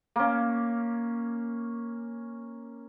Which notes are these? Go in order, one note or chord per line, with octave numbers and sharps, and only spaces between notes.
A#3 C#4